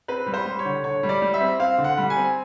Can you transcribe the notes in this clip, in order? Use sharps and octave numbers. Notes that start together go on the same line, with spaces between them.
C4 B4
G3
C5
G3
C#5
D3
D3 C#5
G3
D5
G3
E5
C4
C4 F5
D3
F#5
G3
G#5
C4